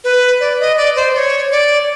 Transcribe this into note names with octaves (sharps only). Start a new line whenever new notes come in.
B4
D5
D#5
D5
C5
D5
C#5
D5